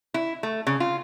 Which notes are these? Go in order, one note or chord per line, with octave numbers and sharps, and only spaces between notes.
E4
A3
C#3
F4